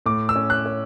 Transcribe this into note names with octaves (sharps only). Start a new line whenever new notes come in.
A2 D6
E6
C#4
F#6
C#4